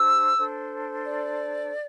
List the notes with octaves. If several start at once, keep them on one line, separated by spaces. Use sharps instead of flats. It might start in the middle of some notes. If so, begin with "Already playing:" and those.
Already playing: D4 G4 C5 E6
D4 A4 C5
D5